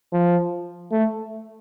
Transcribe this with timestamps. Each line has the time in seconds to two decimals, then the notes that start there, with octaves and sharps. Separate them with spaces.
0.13 F3
0.92 A3